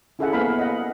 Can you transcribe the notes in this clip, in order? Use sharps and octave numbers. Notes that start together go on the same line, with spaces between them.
C#4 E4 G#4 A4 E5 F#5
A#3 B3 F5 B5
D#5 F#5